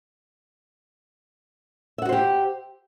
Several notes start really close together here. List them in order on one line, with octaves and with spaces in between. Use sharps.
E5 F#5 F#4 C5 G4